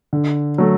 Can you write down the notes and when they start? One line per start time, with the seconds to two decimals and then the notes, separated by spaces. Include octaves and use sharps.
0.13 D3
0.58 F#3 A3